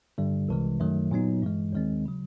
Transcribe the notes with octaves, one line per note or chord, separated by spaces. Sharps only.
G2 D3 G3
C2 C3 E3 G#3
F#2 D#3 F#3 A3
A#2 F#3 B3 D#4
G2 E3 G#3
D#2 D#3 G#3 C4
C#3 F#3